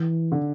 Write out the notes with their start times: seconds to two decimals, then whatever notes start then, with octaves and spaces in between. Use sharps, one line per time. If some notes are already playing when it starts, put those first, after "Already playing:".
Already playing: E3
0.32 D3